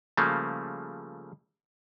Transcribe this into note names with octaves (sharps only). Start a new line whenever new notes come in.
C#3 F3 G3 A3 A#3